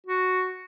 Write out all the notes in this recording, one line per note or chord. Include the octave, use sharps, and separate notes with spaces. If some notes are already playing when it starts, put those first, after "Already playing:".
F#4